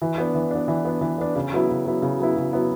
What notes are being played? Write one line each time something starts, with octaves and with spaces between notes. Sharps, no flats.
E3
B3 D4
E3
B3 D4
E3
B3 D4
E3
B3 D4
C#3
F#3 B3 E4
C#3
F#3 B3 E4
C#3
F#3 B3 E4
C#3
F#3 B3 E4